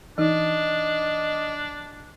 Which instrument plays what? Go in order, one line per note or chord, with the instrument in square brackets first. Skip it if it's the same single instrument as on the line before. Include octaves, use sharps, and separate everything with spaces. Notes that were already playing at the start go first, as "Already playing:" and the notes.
[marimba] E3 D#4 [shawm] D4 [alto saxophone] D#5